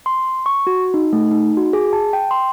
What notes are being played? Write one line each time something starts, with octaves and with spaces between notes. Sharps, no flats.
C6
C#6
F#4
D#4
A3
D#4
F#4
G#4
A5
G5
C6